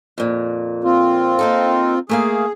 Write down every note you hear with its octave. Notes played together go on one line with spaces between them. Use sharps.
F2 A#2
C4 F4
A#3 D#4 A4
A3 A#3 G#4 F5